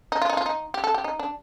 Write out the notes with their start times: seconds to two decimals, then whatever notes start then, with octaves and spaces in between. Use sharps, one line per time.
0.12 D#4
0.22 F4
0.30 D#4
0.37 F4
0.46 D#4
0.74 G4
0.84 A4
0.94 G4
1.04 D#4
1.19 D4